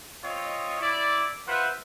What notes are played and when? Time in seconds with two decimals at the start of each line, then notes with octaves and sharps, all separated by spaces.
0.24 C4 F4 C#5 D#5
0.81 E4 D5
1.47 F4 B4 C5 E5 F#5